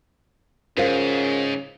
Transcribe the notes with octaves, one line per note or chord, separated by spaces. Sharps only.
G#2 C#3 F4 A#4 C5 F5